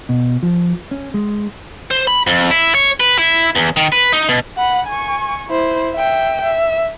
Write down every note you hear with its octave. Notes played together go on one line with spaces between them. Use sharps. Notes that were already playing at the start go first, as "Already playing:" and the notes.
B2
F3
C#4
G#3
C5
B5
F2
E4
C#5
B4
E4
E2
D#3
B4
D#4
B2
F#5 B5
G#5 C#6
E4 C5
E5 G5
E5